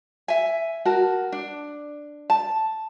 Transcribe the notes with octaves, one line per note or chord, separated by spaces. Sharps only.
E5 G#5
F#4 A#4 A5
D4
A5